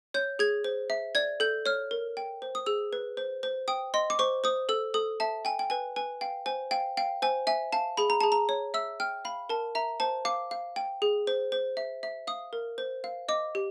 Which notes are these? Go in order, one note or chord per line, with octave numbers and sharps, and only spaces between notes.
C#5 G6
G#4 G#6
C5
E5
D5 G#6
A4 G6
C#5 F6
A#4
G5
C5
D#6
G#4 E6
B4
C5
C5
G5 D#6
D#5 C6
D6
C5 C#6
C5 D#6
A4 E6
A4 D#6
E5 A5
G5 G#5
G5
B4 G#5
B4 G#5
F5 G5
C5 G#5
F5 G5
F5 G5
C5 G#5
E5 G#5
F5 A5
G#4 B5
A#5
G#4 A5
A#5
C#5
E5 E6
G5 F6
F5 B5
A#4 A5
E5 A#5
C5 A5
F5 D6
F5
G5
G#4
C5
C5
E5
E5
F5 D#6
A#4
C5
F5
D#5 D6
G4